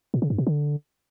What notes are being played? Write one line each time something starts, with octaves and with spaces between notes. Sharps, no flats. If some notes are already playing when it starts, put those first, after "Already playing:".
A#2
C#3
G2
B2
D3